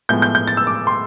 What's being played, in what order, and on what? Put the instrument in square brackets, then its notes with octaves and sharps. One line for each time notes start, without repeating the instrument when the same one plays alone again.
[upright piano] A2 F3 G#3 B3 G6
G6
G6
A6
E6
D6
C6